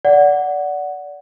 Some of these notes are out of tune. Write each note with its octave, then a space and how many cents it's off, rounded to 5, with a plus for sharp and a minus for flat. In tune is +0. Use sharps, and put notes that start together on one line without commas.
D5 -20 F#5 +0